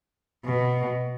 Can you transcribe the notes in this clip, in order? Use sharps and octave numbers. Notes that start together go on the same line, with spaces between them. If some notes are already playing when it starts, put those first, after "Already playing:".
B2